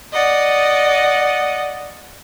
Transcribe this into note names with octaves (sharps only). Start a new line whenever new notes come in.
D5 D#5 F#5